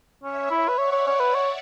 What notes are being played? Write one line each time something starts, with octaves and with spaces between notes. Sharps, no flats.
C#4 C#5 E5
E4
B4
C#5 D5 F#5
C#5
C#5
B4
C#5